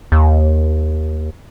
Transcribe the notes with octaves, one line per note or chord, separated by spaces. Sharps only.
D#2